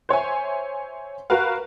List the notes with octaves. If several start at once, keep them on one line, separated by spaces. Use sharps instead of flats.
C5 C#5 E5 G#5
F#4 A#4 B4 F5